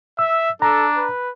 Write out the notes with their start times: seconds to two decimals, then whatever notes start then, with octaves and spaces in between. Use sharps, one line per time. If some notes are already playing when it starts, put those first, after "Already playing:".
0.19 E5 E6
0.62 D4 A4 A#5
0.97 B4